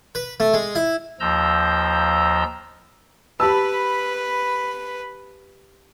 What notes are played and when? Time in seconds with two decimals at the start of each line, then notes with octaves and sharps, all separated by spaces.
0.15 B4
0.40 A3
0.54 G#3
0.75 E4
1.20 D#2 F3 A#5 E6 G6
3.40 G4 B4 A5 B5 E6